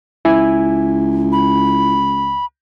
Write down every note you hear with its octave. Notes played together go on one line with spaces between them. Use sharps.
C#2 E4 G#5
B5